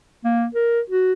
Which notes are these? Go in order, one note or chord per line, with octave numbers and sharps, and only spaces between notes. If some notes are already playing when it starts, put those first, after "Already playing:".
A#3
A#4
F#4